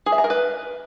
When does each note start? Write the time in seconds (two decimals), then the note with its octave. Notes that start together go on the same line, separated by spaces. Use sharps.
0.06 G#4
0.12 E5
0.18 A#5
0.24 A#4
0.30 B4